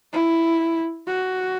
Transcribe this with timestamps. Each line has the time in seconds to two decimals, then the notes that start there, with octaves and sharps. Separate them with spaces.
0.13 E4
1.08 F#4